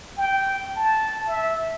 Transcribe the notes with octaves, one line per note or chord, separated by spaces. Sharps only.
G5
A5
E5